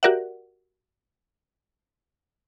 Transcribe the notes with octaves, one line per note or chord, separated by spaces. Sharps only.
F#4 G4 A#4 D5 E5 F#5